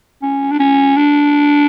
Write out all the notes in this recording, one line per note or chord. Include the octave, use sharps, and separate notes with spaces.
C#4
D4
C#4
D4